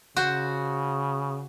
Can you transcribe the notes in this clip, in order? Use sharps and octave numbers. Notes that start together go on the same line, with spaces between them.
C#3 F#4 C5